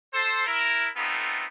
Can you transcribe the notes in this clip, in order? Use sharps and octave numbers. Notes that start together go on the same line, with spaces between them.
A4 C5
E4 A#4
A3 B3 C4 D#4 F4 A4